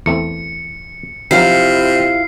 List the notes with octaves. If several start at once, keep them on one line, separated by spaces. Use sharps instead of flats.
E2 A3 C4 C#7
C3 D#3 F3 F#3 E4 F4 F5 C7